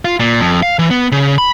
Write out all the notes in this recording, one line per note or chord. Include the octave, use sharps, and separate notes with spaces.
F4
A#2
F2
F5
E3
B3
C#3
B5